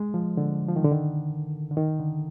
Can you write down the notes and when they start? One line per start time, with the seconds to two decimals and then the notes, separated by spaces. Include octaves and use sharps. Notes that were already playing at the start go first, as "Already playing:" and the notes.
Already playing: G#3
0.14 F3
0.37 D3
0.68 F3
0.76 D#3
0.84 D3
0.92 D#3
1.71 D3
1.77 D#3
1.99 D3